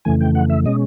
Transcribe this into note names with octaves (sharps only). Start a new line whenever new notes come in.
F2 C#3 E3 A3 G#5
G5
F#5
E5
B2 G#3 C#4 D#5